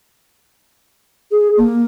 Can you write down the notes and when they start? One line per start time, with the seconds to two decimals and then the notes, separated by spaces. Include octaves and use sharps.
1.31 G#4
1.57 A#3